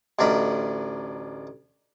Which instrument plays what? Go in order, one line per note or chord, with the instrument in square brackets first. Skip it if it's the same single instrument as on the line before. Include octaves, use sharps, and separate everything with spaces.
[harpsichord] A1 D2 D4 A#4 D#5 B5